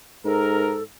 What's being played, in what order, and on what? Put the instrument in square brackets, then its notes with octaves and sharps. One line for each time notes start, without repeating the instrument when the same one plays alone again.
[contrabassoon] G#2 [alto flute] A4 [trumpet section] A#4